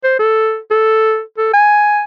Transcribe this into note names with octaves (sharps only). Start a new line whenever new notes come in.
C5
A4
A4
A4
G#5